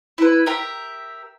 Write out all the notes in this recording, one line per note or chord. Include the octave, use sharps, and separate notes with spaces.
E4 B4
G4 A#4 E5